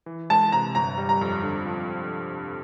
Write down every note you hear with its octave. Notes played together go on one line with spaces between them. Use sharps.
E3
G#3 A5
C3 A#5
G1 A#5
G3
A#5
F2
D3
F3